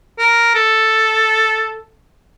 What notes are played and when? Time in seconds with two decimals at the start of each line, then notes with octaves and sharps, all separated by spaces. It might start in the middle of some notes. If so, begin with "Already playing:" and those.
0.19 A#4
0.55 A4